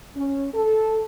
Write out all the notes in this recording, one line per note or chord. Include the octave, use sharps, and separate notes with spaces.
C#4
A4